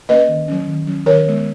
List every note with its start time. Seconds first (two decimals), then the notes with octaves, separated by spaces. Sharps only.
0.09 A#3 C#4 B4 D#5
0.28 D#3
0.48 F#3 C#4
0.67 D#3
0.87 F#3 C#4
1.06 D#3 A#4 C#5
1.26 G#3 B3